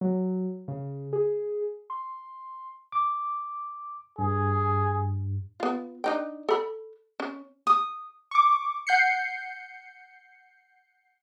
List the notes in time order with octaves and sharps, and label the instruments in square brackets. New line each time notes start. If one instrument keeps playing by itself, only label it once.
[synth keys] F#3
C#3
G#4
C6
[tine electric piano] D6
[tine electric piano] G2 [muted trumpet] G#4
[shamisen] B3 F4
D4 D#4 G5
A4 B5
C#4
[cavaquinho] D#6
[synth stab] C#6 D6
F#5 G6 C7 C#7